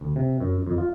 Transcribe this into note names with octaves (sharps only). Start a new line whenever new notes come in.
D2
C3
F#2
F2
F4